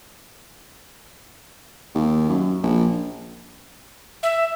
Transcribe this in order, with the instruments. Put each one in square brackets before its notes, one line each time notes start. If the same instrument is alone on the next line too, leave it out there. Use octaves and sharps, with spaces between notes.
[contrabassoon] D#2
F#2
A#1
[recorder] E5